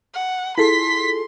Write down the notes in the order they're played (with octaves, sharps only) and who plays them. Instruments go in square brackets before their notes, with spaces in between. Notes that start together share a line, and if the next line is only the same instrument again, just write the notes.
[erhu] F#5
[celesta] E4 C7 [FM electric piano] F4 G#4 A4 [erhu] C6 [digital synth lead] B6